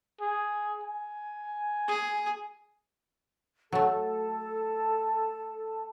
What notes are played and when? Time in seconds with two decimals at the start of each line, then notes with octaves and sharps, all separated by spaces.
0.21 G#4
0.83 G#5
1.88 G#4
3.72 F#3 A3 A4 A5